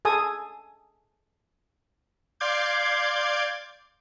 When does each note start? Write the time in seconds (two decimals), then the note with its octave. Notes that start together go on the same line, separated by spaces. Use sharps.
0.05 G#4 A4 G#5 D#6
2.40 D5 F5 C6 D6 G6 G#6